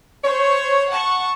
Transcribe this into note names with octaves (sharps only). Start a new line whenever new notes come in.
C5 C#5
F#5 A5 C#6